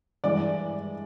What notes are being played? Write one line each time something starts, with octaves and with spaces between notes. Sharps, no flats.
G2 E3 G#3 D5 D6